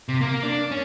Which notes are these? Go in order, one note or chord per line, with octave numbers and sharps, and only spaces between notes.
C3
A#3
D4
C#4